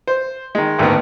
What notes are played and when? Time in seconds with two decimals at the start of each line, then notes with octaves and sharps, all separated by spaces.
0.07 C5
0.55 D#3 G#3
0.79 A1 D2 D#3 A#3 B3